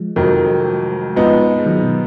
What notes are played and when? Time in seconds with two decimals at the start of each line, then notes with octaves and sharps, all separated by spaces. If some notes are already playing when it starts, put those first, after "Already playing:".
Already playing: F3 G#3
0.16 F1 F2 D#3 F#3
1.16 G#2 F3 B3 D#4
1.59 G#3
1.66 D#3 F#3
1.82 B2